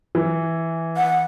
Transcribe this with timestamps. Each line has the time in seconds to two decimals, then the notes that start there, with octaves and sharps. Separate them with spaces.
0.15 E3
0.97 F#5